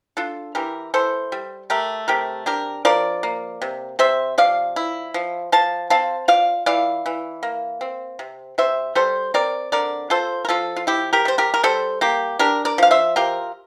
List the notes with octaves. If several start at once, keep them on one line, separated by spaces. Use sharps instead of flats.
D4 F4 A4
E3 G4 A#4
E3 A4 C5
G3
A3 G4 A#4
C3 G4 A#4
D4 G4 A#4
F3 A#4 D5
A#3
C3
C3 C5 E5
F3 D5 F5
E4
F3
F3 F5 A5
C4 F5 A5
F4 D5 F5
E3 D5 F5
E3
A#3
C4
C3
C3 C5 E5
G3 A4 C5
C4 A#4 D5
D3 A#4 D5
F4 A4 C5
A#4
F3 F4 A4
F4
E4 G4
G4 A#4
G3 C5
G4 A#4
A#4
G3 A4 C5
A#3 G4
D4 G4 A#4
A#4 D5
F3 F5
C5 E5
F4 G4 A#4